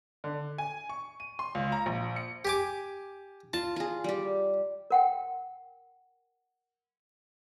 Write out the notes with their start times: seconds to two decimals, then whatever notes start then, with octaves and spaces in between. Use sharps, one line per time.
0.24 D3
0.58 G#5
0.89 C#6
1.20 D#7
1.39 C6
1.55 C#2
1.72 A#5
1.86 A#1
2.16 C#7
2.45 G4 G#5 D6
3.53 F4 A5
3.76 F4 G#4
4.04 G3 G4
4.91 A#4 F#5 G5